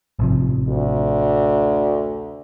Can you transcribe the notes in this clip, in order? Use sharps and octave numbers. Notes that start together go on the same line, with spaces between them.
A1 C3 F3
D2